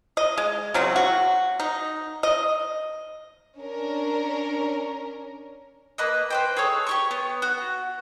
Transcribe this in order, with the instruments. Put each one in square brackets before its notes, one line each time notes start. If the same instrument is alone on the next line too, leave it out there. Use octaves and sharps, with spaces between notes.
[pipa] D#5
G#3
C#3 F#3 C4 F#4
F#4
D#4
D#5
[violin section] C#4 D4 A#4
[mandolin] A#3 B4 D#5
B4 C5 G5
G#4 A4 C#5
G4 C#5 C#6
B3
F#4